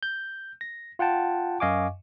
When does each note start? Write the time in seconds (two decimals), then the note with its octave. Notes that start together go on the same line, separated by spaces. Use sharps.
0.03 G6
0.61 A#6
0.99 F4 F#5 G5 A5
1.60 F#2 D#5 F5 G#5 C#6 D6